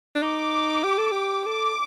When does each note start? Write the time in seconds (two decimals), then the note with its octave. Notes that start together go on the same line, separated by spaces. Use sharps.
0.15 D4
0.22 D#4 D6
0.84 G4
0.98 A4
1.12 G4
1.46 A4 D6